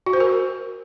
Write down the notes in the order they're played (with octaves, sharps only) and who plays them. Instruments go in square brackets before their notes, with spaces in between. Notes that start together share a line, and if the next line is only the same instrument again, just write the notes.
[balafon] F#4
C5
A#4